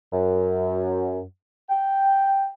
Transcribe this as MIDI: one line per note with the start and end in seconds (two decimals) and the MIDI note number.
0.13 1.21 42
1.69 2.49 79